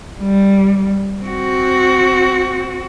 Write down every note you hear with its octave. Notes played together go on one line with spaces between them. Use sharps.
G3
C4 F#4